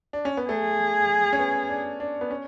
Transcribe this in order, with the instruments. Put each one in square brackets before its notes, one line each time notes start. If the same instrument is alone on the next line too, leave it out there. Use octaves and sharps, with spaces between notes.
[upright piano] D4
C#4
B3
[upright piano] A3 [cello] G#4
[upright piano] C#4
B3
D4
D4
B3
C#4